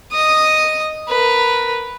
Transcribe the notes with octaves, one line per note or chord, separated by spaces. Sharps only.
D#5 D#6
A#4 B4